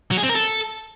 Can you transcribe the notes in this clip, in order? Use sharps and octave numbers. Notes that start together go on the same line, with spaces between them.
F#3
G#4
C4
A#4
A4